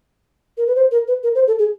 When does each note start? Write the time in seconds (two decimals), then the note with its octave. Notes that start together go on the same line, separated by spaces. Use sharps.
0.58 A#4
0.67 B4
0.76 C5
0.91 A#4
1.08 B4
1.23 A#4
1.35 C5
1.47 A4
1.59 G#4